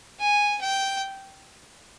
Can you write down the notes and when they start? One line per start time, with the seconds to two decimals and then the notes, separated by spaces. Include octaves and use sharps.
0.19 G#5
0.61 G5